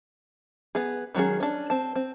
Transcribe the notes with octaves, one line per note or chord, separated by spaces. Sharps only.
B3 G#4
D#3 F#3 G#3 C#4 G#4
C#4 D4
C4 A5
C4